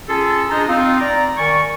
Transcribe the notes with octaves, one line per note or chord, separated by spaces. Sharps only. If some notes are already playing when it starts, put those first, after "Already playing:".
C#4 F4 G#4 A4
D4 F4 G#4 C5 D#5 A#5
C4 D#4 F4
D5 A#5
D#3 D5 G#5 C#6